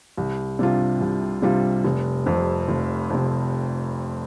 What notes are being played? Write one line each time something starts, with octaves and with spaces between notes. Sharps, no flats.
C2
C3 G3 D4 F4
C2
C3 G3 D4 F4
F1
F2 C3
F1
F2 C3